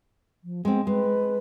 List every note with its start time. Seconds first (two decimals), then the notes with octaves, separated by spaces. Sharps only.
0.44 F3
0.65 G#3 B3 C4
0.87 G#3 B4